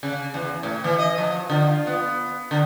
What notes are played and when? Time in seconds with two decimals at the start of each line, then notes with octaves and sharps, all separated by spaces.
0.03 C#3
0.34 E2
0.63 A2
0.84 E3
0.99 D#5
1.18 F3
1.50 D3
1.67 F4
1.87 B3
2.51 D3